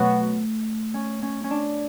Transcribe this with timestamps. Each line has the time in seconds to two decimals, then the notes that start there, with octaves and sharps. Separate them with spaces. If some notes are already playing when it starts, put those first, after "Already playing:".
Already playing: B2 F#3 A3 B3 F#4
0.94 C#4
1.22 C#4
1.44 C#4
1.50 D4